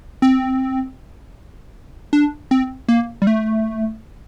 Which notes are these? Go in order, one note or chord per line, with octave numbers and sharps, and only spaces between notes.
C4
D4
C4
A#3
G3
A3